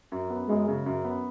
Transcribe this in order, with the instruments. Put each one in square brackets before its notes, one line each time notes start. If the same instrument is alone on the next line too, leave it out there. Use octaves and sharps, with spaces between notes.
[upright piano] F#2
B3
[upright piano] F#2 [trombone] G#3
[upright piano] C#3
F#2
B3